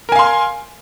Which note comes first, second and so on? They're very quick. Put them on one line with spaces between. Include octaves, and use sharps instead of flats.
A#4 G#5 F5 C6